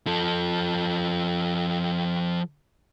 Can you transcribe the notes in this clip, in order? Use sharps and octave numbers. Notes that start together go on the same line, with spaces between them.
F3 A4